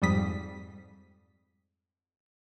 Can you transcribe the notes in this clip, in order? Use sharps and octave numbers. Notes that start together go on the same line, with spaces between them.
F2 G#2 G3 D#6 B6